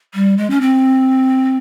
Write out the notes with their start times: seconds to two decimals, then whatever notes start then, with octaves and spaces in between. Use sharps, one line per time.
0.14 G3
0.37 G#3
0.50 C#4
0.61 C4